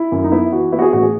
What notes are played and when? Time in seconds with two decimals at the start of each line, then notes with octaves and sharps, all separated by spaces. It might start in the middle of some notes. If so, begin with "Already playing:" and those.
Already playing: E4
0.12 F#2
0.24 D#4
0.32 B3 E4
0.52 E3 F#4
0.72 B3 E4
0.79 F#4
0.82 G#4
0.93 A1 F#4
1.03 G#4